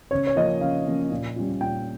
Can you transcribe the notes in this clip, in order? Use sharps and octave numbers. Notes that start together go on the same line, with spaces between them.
C#3 C#5
C#5
F3 A#3 C#4 D#5
C#3 F5
F3 A#3 C#4
A#2
G3 C#4 F4
A#2 G5